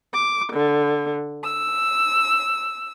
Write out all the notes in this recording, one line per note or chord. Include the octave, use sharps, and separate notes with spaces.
D6
D3
E6